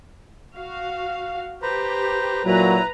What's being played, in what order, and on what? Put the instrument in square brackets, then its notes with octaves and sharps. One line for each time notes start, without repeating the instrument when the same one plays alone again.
[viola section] F#4 F5
[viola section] G4 [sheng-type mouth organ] B4 C5 A#5
[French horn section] A#2 F#3 [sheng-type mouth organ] E4 [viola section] B4 A#5